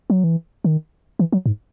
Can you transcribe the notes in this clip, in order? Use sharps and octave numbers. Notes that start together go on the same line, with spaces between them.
F#3
E3
D#3
E3
F#3
G#2